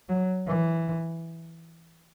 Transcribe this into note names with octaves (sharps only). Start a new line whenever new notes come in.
F#3
E3